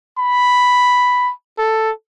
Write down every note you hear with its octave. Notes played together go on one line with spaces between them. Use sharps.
B5
A4